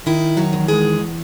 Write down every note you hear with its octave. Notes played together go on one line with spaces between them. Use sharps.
D#3 E4
F#3 F#4
E2
G#3 G#4